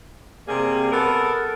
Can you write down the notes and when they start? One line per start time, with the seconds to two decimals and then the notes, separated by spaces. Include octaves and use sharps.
0.48 C3 G3 A#3 G#4
0.91 B3 A4 A#4